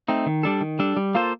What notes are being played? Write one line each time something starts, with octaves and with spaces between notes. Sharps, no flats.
A3 C4 D#4
D#3
G3 D4 A4
D#3
G3 D4 A4
G3
A#3 F4 A4 C5